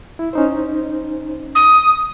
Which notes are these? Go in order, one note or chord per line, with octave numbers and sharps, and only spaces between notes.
E4
C#4 D#4 C5
D#6